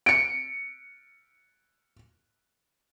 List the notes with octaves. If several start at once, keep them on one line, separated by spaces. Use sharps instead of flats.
C#7 D7